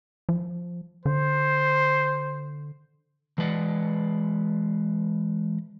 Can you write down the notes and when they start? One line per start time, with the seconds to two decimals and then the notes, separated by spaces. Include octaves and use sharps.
0.29 F3
1.06 D3 C5
3.38 E3 G#3 B4 D5 D#5 F#5